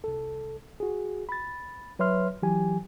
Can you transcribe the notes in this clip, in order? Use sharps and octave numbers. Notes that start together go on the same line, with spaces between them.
C2 A4
F#4 G#4
B5 A6
F#3 B4 C#5 E5 C6 F6
E3 F#3 G4 G#5